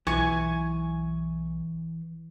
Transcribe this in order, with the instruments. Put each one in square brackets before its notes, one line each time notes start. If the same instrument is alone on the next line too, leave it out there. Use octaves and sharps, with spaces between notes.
[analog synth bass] B1 [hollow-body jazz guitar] E3 [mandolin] G#5 C#6